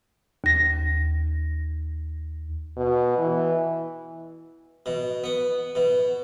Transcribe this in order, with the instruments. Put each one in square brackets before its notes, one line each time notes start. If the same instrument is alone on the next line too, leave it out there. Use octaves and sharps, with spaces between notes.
[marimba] D#2 A#6
[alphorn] B2
E3
[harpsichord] B2
B3
B2